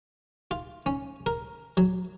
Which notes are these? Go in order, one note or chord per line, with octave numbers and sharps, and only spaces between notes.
F4
C#4
A#4
F#3